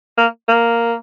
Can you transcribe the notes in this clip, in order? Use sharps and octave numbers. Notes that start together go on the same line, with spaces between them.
A#3
A#3